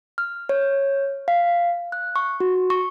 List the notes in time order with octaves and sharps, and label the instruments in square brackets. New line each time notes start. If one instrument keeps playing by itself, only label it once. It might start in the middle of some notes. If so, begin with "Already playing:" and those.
[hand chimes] F6
C#5
F5
F#6
C#6
F#4
C#6